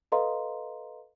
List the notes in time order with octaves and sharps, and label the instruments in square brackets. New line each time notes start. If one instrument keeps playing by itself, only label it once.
[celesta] A4 B4 D#5 F5 A#5 C6